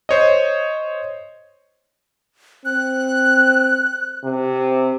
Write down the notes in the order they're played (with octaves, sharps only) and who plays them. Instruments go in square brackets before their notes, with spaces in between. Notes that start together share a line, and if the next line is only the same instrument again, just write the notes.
[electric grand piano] C5 C#5 D#5
[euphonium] C4 [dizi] F#6
[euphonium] C3